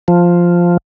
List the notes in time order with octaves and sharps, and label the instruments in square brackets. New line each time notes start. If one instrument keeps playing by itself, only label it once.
[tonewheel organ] F3